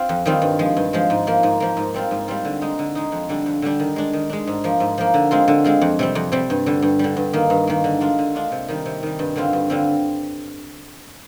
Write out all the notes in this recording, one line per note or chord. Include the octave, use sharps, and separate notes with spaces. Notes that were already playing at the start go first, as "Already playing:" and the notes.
Already playing: C4 F4
F2
D#3 G3 C4 F4
G2
F3 G#3
G2
F3 G#3
G#2
F3 A#3
G#2
F3 A#3
G#2
G3 C4 F4
G#2
G3 C4 F4
D3
G#3 D#4
D3
G#3 D#4
F2
D3 G3 D4
F2
D3 G3 D4
D#3
G#3 D4
D#3
G#3 D4
G#2
F3 A#3
G#2
F3 A#3
D3
G#3 C4 F4
D3
G#3 C4 F4
F2
C3 G3 C4
F2
C3 G3 C4
G2
D3 G3
G2
D3 G3
G2
D#3 A#3
G2
D#3 A#3
D3
G#3 D4 F4
D3
G#3 D4 F4
C3
D#3 G3
C3
D#3 G3
G2
D3 G3 C4 F4
G2
D3 G3 C4 F4